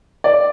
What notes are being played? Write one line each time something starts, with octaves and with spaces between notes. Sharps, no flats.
D5